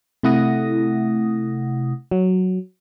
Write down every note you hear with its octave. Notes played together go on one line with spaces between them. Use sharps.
C3 A3 E4 F#5 D#6 A#6
F#3